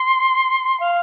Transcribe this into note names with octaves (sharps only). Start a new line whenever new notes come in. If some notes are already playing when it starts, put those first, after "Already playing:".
Already playing: C6
F5